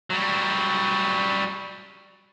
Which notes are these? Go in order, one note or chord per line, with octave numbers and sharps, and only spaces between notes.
F#3 G3